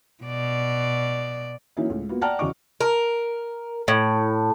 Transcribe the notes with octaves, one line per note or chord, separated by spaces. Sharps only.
B2 D5
E3 F#3 A#3 C#4 D#4 E4
C#2 A2
A#3 B3 F4 F#4
D5 F#5 G5 A5 A#5 F6
E2 C#3 F#4 D#5 C#6 D6
A#4
A2